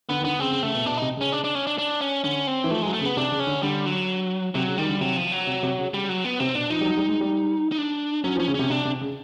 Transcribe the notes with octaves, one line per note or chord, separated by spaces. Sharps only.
D3 B3
D#3
D3 B3
C#3 C4
C#3
C#3 A3
B2
B2 D4
C3 D#4
C#3 C#4
D4
D4
C#4
D4
D4
C#4
D3 C#4
C4
E3
F3 A3
F#3 G#3
A3
C#3
B3
C3 D4
C#3
C#4
D3
D3 G3
F#3
C3 F#3
C#3
D#3 G3
D3
C3 F#3
F3
F#3
C3
C3
C#3
C#3 G3
F#3
B3
C3 C4
B2 D4
F3 D#4
G3
F#3
G3
G#3
G3
D#4
D4
F#3 C#4
F3
C#4
C#3
C3 C#4
C3 D4
C3
C#3